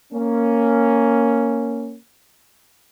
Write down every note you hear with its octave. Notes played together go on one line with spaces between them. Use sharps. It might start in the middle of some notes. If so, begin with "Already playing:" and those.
A#3 C#4